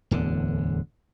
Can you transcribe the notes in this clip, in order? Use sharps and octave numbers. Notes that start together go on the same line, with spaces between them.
D1 E2 D3